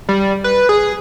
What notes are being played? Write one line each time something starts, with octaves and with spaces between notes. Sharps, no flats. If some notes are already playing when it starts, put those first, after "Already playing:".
G3
B4
G#4